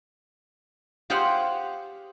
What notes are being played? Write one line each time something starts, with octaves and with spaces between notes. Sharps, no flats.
F4 G4 G#4 C5 F5 F#5